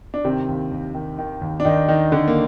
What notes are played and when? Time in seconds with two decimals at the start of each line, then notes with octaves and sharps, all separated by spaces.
0.14 D4
0.24 C3 D#3 C4
0.49 D#2
0.71 D#2
0.95 D#3
1.19 D#3
1.42 D#2
1.60 D4
1.65 D#2 D#3 D#4
1.88 D#3 D#4
2.12 D3 D#3 D4
2.28 A#3